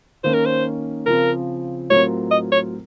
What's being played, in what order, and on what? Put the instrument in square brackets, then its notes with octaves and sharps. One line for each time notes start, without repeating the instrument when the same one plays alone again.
[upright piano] D#3 A#3 C#4 [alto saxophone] C5
[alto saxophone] A#4
C5
[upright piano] C#3 F3 C4 [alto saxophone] A#4
[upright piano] A2 F#3 C4 F4 A#4 [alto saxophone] C#5
[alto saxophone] D#5
C#5